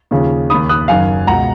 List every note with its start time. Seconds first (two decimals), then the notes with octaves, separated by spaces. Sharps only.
0.11 D#2 C#3 F3
0.50 D#2 D#3 B5 D#6
0.69 D#6 F#6
0.88 F#1 F#2 D#3 F5 G#5
1.27 C#2 B2 F#5 A#5